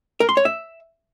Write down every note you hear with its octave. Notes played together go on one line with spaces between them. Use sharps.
A#4
C6
C#5
E5